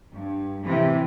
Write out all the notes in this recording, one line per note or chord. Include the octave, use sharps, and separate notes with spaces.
G2
A2 C3 E3